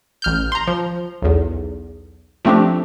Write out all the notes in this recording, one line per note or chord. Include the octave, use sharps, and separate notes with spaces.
A1 F6 G6
A#5 C6
F3
B1 E2
F3 A3 C4 D4 G4